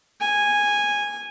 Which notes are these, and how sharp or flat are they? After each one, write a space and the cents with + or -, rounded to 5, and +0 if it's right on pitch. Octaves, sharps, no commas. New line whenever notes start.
G#5 -10